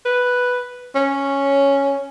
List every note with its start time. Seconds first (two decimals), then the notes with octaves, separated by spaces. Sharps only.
0.05 B4
0.95 C#4